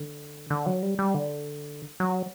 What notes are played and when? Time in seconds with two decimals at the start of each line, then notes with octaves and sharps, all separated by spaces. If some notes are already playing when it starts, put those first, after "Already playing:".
Already playing: D3
0.50 D3
0.66 F#3
0.83 G3
0.99 G3
1.14 D3
2.00 F#3